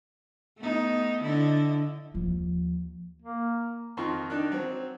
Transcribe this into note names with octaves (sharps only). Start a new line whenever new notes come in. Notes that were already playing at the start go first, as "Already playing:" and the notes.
A3 B3 D#4
D3 E4 D#5
D#2 F3
A#3
F2 D#3 D#4 F4 C6 C#6
D#3 D4 D#4 F#6
F#3 C4